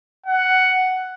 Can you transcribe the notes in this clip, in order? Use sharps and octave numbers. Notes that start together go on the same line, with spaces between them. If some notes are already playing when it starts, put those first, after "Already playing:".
F#5